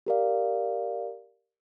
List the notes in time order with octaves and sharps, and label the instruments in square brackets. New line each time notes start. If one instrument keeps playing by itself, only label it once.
[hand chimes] G4 A#4 D5 F5